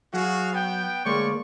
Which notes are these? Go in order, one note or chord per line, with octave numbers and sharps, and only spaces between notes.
F#3 F#4 G#4 F5
B3 G5
D2 G#3 A#3 C#5 D5 C#6